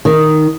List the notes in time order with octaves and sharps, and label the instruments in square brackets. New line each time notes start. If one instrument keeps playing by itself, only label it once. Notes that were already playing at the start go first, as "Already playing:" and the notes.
[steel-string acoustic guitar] D#3